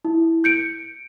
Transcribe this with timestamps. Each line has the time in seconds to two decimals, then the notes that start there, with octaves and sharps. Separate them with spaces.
0.05 E4
0.44 G6 C#7 D7